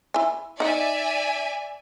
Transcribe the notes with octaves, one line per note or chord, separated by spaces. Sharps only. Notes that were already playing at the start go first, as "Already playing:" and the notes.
E4 G#5
D#4 D5 E5 F#5 G#5